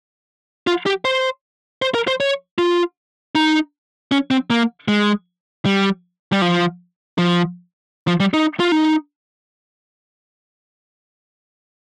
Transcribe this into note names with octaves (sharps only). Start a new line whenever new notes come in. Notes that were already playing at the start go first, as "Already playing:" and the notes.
F4
G4
C5
C5
A#4
C5
C#5
F4
D#4
C#4
C4
A#3
G#3
G3
G3
F3
F3
F3
G3
D#4
F4
D#4